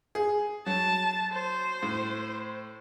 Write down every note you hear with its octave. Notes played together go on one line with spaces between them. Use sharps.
G#4
F#3 A5
C5
A2